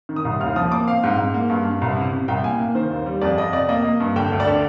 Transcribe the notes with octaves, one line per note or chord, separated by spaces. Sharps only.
D#3
D#6
C2
D#2 F6
F3 D#6
A#3 D6
C4 F5
G#2
G#2
A#3
G2
G2
C2
C3
C3
C2 G5
A#3 G#5
A#3
D#3 C5
D#2
G3
F2 D5
F2 D#5
C3 D5
A#3 D#5
A#3
G2
D3 G5
D2
D5
D3